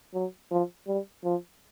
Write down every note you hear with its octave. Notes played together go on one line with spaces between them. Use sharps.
F#3
F3
G3
F3